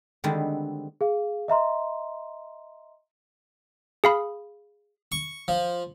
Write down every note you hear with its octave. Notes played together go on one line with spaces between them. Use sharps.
D3 D#3 G3 G#3 B3 C4
G#4 F5
D#5 E5 A#5 C6
G#4 F5 B5
C#6
F3